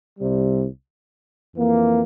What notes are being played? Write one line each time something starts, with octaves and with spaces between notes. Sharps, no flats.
C2 C3 G3
F2 E3 A#3